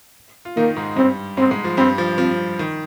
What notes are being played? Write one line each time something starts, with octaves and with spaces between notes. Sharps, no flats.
F4
D#3 A#3 D#4
G#2 G#3
G2 G3 C4
G#2 G#3 C4
G#2 G#3
F3
G2 G3 C4
F3
F3 C4
D#3